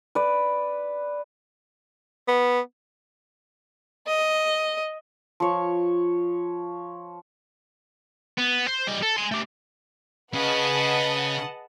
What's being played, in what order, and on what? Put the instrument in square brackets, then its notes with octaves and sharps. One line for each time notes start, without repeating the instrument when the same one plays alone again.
[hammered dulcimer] B4 D5
[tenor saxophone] B3
[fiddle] D#5
[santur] F3 C#5
[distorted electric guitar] B3
C5
G3 D#5
A4
G#5 C6
A3 G4
[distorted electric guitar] C#3 [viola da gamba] G#4 B4 [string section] D#5 F#5 A5